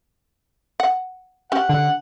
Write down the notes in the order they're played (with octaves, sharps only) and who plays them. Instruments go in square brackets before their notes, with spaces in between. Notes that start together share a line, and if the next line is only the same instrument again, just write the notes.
[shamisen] F#5
[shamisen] C#4 G4 [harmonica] F#5
[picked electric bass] D3 [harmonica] F#5